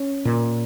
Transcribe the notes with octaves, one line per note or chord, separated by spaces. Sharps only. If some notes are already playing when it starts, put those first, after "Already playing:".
Already playing: C#4
A#2